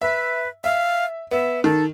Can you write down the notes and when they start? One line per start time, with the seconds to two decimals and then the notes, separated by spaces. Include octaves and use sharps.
0.01 B4 E5
0.64 E5 F5
1.31 B3 E5
1.64 D#3 A4